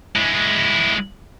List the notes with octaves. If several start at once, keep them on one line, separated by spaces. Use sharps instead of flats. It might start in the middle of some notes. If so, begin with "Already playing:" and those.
G#3 E4